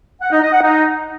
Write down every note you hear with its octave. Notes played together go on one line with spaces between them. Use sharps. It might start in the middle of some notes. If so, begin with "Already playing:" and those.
F#5
D#4
D#5
F#5
D#4